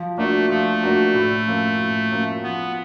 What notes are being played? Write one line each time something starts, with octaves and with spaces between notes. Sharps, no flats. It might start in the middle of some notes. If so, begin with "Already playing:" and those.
Already playing: F3
A3 A#3 D4 F#4
F3 A3
A#3 D4 F#4
A2
F3 A#3 C#4
A2
F3 A#3 C#4
F3 B3